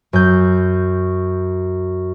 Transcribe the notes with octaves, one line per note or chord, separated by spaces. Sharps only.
F#2 G6